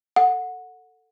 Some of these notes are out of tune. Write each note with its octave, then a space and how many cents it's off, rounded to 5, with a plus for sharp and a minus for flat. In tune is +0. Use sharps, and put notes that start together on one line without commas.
A4 +15 F#5 -15